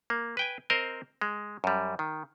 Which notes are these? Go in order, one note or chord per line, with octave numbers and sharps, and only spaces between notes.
A#3
B4 G5 G#5
C4 A#4 C5 D#5
G#3
F#2 G3
D#3